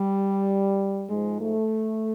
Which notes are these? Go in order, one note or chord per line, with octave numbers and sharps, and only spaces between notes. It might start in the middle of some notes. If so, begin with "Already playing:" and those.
Already playing: G3
G#2 F3 G#3
A3